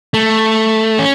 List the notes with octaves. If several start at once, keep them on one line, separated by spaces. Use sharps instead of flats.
A3
C#4